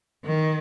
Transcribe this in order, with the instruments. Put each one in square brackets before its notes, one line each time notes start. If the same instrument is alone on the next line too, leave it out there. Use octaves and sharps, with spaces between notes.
[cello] D#3